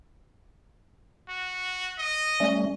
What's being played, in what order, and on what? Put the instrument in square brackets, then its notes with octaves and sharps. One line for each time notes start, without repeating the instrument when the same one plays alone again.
[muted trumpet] F#4
D#5
[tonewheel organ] G3 A3 C#4